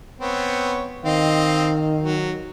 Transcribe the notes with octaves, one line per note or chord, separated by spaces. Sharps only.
B3 C4 C#5
D#3 C4 D#5 F5
F#3